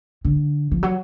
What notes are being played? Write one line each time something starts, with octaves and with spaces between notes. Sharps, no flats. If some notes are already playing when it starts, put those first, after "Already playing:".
D3
F3
F#3